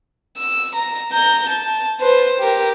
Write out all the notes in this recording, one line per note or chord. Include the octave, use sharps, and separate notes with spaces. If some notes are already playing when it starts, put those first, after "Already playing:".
E6
A#5
A#5 G6
A5
B4 C5
G4 A#4